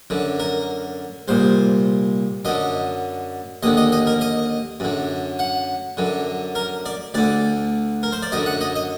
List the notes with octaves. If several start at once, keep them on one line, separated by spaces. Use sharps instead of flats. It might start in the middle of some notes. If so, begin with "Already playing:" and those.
F#2 D3
A#4
C2 A#2 C5
F#2 D3 D#5
D#2 D3 D#5
D#5
D#5
A#4
D#5
F#2 D3
F#5
F#2 D3
A#4
D5
D2 D3 D5
A#4
C5
D5
F#2 D3 D#5
F#5
D#5
D#5